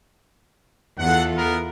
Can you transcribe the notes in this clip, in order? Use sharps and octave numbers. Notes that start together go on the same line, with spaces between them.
E2 F4 A4 F#5
B3 A#4